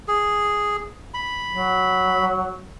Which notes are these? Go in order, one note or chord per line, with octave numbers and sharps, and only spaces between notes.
G#4
B5
F#3